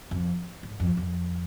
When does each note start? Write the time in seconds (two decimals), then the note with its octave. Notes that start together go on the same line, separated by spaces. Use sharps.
0.11 F2
0.63 G#2
0.80 F2
0.97 F2